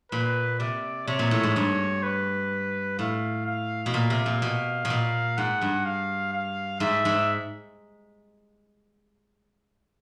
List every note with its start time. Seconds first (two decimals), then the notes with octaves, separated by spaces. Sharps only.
0.12 A#2 B4
0.60 C3 D5
1.07 C3 C#5
1.19 A#2
1.31 A2
1.43 G#2
1.56 G2
2.03 B4
2.99 A2 F5
3.46 F5
3.86 B2
3.94 A#2 F5
4.10 C3
4.26 A#2
4.42 B2
4.85 B2
4.90 A#2
5.37 G#2 F#5
5.62 G2
5.85 F5
6.33 F5
6.80 G#2 E5
7.05 G#2